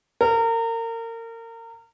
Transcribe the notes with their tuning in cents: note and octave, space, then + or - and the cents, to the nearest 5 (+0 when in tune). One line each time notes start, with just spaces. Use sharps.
A#4 -30